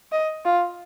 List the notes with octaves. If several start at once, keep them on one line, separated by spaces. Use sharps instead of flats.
D#5
F4